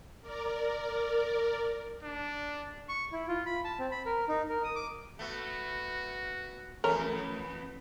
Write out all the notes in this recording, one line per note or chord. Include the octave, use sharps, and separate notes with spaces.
A#4 D5
D4
C#6
E4
F4
B5
A5
C4
B5
A#4
D#4
A#4
D#6
D6
A3 B3 F#4
F2 E3 A3 B3 C#4 A#4